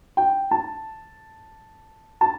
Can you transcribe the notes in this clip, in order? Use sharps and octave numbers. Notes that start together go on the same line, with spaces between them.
G5
A5
A5